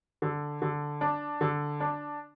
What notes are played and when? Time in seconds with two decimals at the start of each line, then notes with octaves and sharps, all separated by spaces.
0.22 D3
0.62 D3
1.01 D4
1.41 D3
1.80 D4